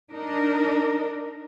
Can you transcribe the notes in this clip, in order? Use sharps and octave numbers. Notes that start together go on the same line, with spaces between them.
D4 D#4 A#4